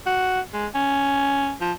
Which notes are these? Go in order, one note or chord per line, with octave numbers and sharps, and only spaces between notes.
F#4
G#3
C#4
F3